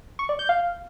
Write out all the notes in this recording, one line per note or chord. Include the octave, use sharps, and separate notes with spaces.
C#6
D5
G6
F5